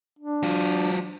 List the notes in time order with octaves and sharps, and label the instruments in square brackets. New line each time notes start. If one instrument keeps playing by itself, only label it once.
[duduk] D4
[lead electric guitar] F#3 F4